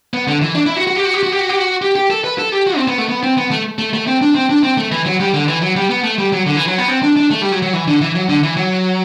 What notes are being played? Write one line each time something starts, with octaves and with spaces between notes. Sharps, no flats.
B3
D3
E3
D4
E4
F#4
F#4
G4
F#4
G4
F#4
G4
F#4
G4
F#4
G4
G4
A4
B4
A4
G4
F#4
C4
B3
A3
B3
C4
B3
A3
A3
A3
C4
D4
C4
D4
C4
A3
E3
F#3
G3
D3
E3
F#3
G3
B3
A3
G3
F#3
D3
E3
F#3
B3
C4
D4
D4
A3
G3
F#3
F#3
E3
D3
E3
F#3
D3
E3
F#3